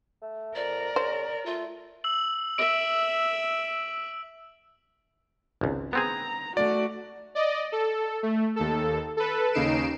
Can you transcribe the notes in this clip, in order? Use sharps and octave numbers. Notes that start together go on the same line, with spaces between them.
A3
F2 A#4 D5
C#3 C5
A3 F4
E6 F#7
E5 D7
G#1 C#2
B3 C4 G#4 A#5
A3 F#4 D5
D5 D#5
A4
A3
D#2 A4
A4 B4
D#2 C#3 D#4 C7 D7 E7